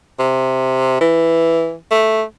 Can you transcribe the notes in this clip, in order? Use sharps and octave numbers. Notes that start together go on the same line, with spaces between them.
C3
E3
A3